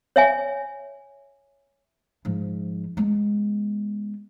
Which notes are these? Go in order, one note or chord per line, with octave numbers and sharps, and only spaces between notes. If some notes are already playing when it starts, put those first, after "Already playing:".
C#5 E5 G#5
G#2 F3
G#3 B3